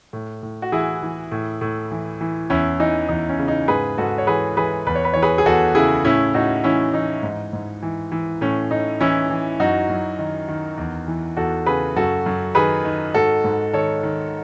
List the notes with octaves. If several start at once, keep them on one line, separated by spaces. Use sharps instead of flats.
A2
A2
F#4
E3 E4 G#4
E3
A2
A2
E3
E3
E2 C#4 E4
E3 D#4
E2 D#4
C#4
C#3
D#4
G#2 G#4 B4
G#2 F#4 A4
C#5
E3 G#4 B4
E3 G#4 B4
E2 B4
C#5
B4
E3 C#5
G#4 B4
G#4
E2 F#4 A4
C#3 E4 G#4
A2 C#4 E4
A2 D#4 F#4
E3 C#4 E4
E3 D#4
G#2
G#2
E3
E3
A2 C#4
A2 D#4
E3 C#4 E4
E3
F#2 D#4 F#4
F#2
D#3
D#3
E2
E3
E2 F#4 A4
C#3 G#4 B4
F#2 F#4 A4
F#2
D#3 G#4 B4
D#3
G#2 F#4 A4
G#2
D#3 A4 C#5
D#3